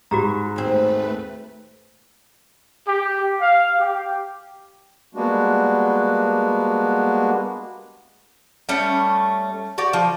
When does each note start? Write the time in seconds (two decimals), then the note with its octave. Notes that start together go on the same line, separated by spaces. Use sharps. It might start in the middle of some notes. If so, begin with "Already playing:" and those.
0.11 G#2 F#4 G4 A#5
0.56 D#2 A3 C4 B4
2.86 G4
3.40 F5
3.79 G4
5.15 G3 G#3 A#3 B3 D4 F#4
8.69 G3 A3 C#4
9.78 F#4 G4 D5
9.93 F3